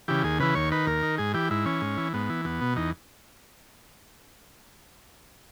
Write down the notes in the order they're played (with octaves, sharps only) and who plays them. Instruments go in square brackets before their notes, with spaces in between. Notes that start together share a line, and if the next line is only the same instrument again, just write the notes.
[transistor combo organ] C#3 E3 G4
D#2 G#4
C#3 E3 B4
D#2 C#5
D#3 B4
D#2 A#4
D#3
G#2 G#4
E3 G4
G#2 E4
E3 C#4
G#2
E3
G#2 B3
E3
E2 B3
B2
E2 D#4